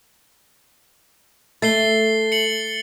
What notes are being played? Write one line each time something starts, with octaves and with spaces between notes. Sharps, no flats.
A3 A6 C7 G7
C#7 F#7